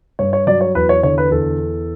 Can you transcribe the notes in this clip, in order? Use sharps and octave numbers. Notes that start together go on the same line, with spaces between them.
G2 C#5
C#5
F#3 D5
C#5
E2 B4
C#5
D3 C#5
B4
E2 A4